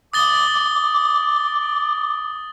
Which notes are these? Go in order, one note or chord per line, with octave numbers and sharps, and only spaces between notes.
D6 D#6 A6 G7